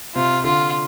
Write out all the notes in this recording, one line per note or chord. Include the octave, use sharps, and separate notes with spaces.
C3 F4
D3 F4